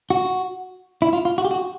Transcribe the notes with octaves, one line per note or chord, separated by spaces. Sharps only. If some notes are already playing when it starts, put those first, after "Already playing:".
F#4
E4
F4
F4
F#4
G4
F#4